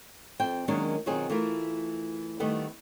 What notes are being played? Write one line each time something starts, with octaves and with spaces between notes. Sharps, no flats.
F2 C4 C5 G5
D#3 F#3 G#3 A#3 C#4 D4
B2 D#3 F#3 C4 F4 G#4
E3 A3 F4 A#4
D#3 G3 A3 B3 G4 B4